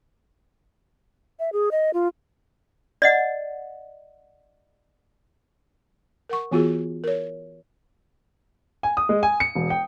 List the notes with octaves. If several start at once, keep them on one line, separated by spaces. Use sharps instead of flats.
E5
G#4
D#5
F4
D5 D#5 F#5
A#4 F#5 C#6
E3 B3 F4 F#4 G#4
A#4 C#5
G#5
D#6
G#3
G#5
C#7
E1
G5